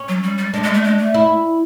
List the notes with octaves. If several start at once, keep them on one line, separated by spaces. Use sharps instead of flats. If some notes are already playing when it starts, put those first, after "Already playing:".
Already playing: C#4
F#3
G3
G3
G#3 D4
G#3
A3
G#3
A3
E4